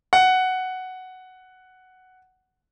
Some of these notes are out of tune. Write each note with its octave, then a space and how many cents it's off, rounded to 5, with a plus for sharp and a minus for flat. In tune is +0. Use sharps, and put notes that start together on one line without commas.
F#5 +5